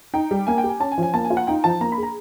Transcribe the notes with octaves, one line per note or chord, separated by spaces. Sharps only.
D#4 G5
G3
A#3 G#5
G5
G4
G#5
C#4 A5
G#5
F3
G#5
A#3 A5
G#5
F4
F#5
D#4 G5
F3 A5
A#3 A#5
B5
G#4
A#5